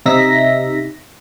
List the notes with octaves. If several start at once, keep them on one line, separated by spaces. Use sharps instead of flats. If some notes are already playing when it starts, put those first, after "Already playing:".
C3 D#4 E5 A#6 B6